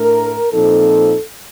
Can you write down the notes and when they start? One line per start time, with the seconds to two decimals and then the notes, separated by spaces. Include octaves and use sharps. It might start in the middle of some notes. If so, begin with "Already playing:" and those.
Already playing: A2 A3 D4 A#4
0.51 A#2 F3 C4 D#4 A4